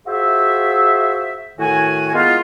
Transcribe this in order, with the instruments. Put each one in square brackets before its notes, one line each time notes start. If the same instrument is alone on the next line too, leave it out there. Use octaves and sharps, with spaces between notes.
[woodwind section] F4 F#4 G#4 C5 E5
A2 D#3 F#4 G#5
G#3 A#3 B3 E4 F4